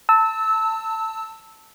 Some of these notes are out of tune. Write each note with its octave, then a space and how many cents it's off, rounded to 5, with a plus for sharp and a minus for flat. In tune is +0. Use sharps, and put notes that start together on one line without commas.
A5 +20 E6 -20